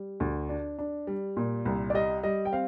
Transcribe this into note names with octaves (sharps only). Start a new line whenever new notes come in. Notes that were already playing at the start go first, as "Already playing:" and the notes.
Already playing: G3
D2
D4
D4
G3
A#2
C2
D5
G3 D#5
G3 D#5
G5
C4 F5